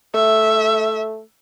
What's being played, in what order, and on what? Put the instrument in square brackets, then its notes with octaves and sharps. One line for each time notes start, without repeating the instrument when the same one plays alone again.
[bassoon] A3 [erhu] E5